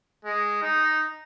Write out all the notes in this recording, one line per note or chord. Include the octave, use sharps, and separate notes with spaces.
G#3
D#4